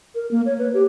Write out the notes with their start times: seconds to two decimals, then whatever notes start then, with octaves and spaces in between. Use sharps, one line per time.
0.15 A#4
0.31 A#3
0.46 C#5
0.58 B4
0.74 G4